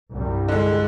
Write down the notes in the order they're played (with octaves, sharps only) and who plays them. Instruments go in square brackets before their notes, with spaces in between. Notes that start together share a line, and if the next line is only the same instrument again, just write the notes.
[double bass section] C2 G2 G3
[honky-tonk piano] D3 G#3